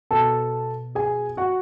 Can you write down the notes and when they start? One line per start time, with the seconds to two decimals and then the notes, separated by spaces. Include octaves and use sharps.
0.11 B2 A4 A5
0.95 G#4 G#5
1.37 F#4 F#5